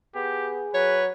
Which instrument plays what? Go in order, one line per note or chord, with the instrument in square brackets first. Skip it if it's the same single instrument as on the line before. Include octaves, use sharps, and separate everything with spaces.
[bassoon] B3 [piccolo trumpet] G4 [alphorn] G#4
[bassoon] F#3 [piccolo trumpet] B4 [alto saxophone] C#5